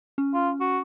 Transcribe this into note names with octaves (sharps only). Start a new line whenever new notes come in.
C#4
F4
F#4